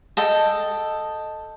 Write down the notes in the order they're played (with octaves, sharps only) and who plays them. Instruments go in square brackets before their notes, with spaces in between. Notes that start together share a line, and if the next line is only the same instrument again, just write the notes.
[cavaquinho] A4 D#5 G5